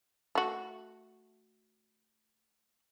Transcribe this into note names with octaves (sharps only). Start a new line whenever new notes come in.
A3 F#4